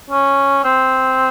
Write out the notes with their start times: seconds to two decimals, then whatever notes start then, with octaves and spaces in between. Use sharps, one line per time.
0.10 C#4
0.64 C4